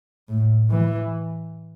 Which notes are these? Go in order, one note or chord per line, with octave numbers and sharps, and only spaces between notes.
A2
E3